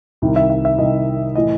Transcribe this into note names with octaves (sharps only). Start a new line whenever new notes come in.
C2 C3 D#3
E5
E5
E5
C2 C3 D#3 D#5
A2 E3 D#5